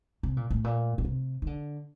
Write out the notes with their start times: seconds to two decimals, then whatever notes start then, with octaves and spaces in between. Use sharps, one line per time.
0.23 C3
0.37 A#2
0.50 A2
0.64 A#2
0.98 A#2
1.05 C3
1.42 D#3
1.47 D3